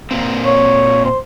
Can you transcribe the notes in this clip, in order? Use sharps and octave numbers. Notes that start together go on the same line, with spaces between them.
A#2 A#3 C4
C#5
C5